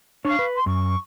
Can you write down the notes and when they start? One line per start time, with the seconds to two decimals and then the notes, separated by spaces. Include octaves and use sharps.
0.25 D4 C#5 F5 C#6
0.39 B4
0.54 C6
0.66 F#2 C#6